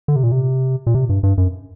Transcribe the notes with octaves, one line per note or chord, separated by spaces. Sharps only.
D3
C3
A#2
C3
A#2
C3
G2
G2
F#2